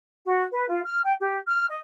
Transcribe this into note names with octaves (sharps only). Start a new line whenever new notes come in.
F#4
B4
F4
F6
G5
G4
F6
D#5